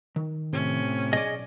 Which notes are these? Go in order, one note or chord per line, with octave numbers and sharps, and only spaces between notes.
D#3
A2 C3 C#4
B1 G#4 D5 D#5